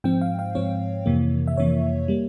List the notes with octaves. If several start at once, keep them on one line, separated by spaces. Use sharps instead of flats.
G#2 F3 C4 G5
F5
F5
G#2 F3 C4 C#5
F2 C3 E3 A#3
E5
F2 C3 E3 A#3 C#5
G3 A#3